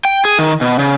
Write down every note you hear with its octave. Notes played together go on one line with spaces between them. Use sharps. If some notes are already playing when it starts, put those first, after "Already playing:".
G5
G#4
D#3
B2
C#3